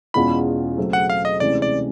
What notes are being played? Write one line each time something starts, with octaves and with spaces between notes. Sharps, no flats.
E2 B2 G#3 C#4 F4 B5
C#3 F#3 A3 C4
F#5
F5
D#5
D2 C3 E3 G#3 C#4 D5
D5